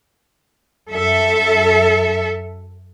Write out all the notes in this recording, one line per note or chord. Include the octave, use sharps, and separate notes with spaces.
F#2 A4 E5